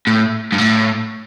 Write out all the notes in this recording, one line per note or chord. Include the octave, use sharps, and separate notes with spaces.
A2
G2
A2